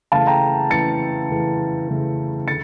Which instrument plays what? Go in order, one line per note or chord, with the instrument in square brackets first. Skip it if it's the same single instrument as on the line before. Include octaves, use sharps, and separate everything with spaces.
[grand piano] C#3 E3 A3 F5 A5
G5 A#5
C#3 E3 A3 A6 C#7
C#3 E3 A3
C#3 E3 A3
D3 A6 C#7